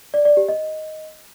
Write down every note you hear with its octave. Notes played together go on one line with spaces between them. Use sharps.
D5
D5
G4
D#5